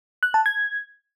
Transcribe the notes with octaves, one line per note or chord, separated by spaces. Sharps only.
F#6
A5
G#6